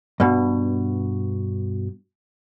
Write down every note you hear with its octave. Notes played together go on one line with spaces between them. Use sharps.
G2 B2